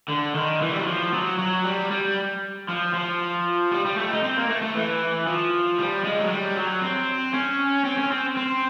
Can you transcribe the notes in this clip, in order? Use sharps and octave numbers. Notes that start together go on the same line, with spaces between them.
D3
D#3
E3
G3
F#3
F3
F#3
F#3
G3
G3
F3
F3
G3
G3
A3
D#4
C4
A#3
A3
A3
E3
F3
G3
G#3
F#3
G3
F#3
C4
C#4
C4
C#4
C4
C4